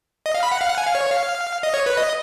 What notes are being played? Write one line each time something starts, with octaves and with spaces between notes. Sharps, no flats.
D#5
F5
B5
F#5
F5
F#5
G#5
F5
C#5
F5
D#5
C#5
B4
D#5